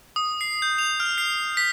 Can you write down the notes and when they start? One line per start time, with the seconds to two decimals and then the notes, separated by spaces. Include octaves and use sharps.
0.16 D#6
0.41 C7
0.62 G6
0.78 F7
1.00 F6
1.18 C7
1.57 B6